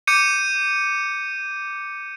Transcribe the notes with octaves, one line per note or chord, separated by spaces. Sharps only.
D6 G6 C#7 D#7